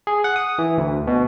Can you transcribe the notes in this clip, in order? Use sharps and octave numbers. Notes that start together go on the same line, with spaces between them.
G#4
F#5
D#6
E3
D2
B2